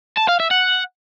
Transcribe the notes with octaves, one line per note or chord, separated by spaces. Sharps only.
A5
F5
E5
F#5